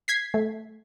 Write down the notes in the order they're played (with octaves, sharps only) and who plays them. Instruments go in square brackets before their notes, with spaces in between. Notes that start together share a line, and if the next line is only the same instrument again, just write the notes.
[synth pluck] G#6 B6 C7
[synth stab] A3